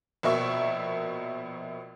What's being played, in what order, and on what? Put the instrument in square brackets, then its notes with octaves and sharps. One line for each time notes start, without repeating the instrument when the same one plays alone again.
[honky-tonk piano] A#1 B2 A#4 E5 C#6